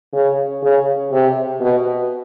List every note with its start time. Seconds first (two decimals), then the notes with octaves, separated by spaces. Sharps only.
0.13 C#3
0.62 C#3
1.12 C3
1.61 B2